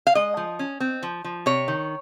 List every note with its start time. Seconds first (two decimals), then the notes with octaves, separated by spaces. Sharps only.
0.07 F5
0.15 G#3 D#5
0.37 F3
0.59 C#4
0.80 C4
1.03 F3
1.24 F3
1.46 C3 C#5
1.68 D#3